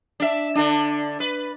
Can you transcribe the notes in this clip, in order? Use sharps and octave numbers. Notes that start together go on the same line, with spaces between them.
D4 E5
D3 D4
B4